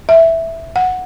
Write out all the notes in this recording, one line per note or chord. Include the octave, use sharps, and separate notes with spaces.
E5
F#5